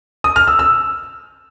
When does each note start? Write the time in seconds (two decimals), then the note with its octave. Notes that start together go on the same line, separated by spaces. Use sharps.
0.24 D#6
0.36 F6
0.47 E6
0.59 E6